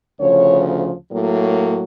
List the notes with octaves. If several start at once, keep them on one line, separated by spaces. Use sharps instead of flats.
D2 C#3 F3 C#5
A2 F#3 A#3